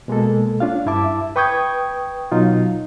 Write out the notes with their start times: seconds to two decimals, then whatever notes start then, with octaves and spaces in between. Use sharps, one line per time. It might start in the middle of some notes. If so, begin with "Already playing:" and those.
0.08 B2 G#3 A#3 A4
0.60 C#4 D4 F4 F5
0.86 G2 E4 E5 A5 D6
1.36 B4 G5 C#6 D#6 G6 G#6
2.32 B2 F#3 D#4 F4